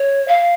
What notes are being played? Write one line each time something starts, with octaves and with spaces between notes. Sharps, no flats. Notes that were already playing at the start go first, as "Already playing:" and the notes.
Already playing: C#5
F5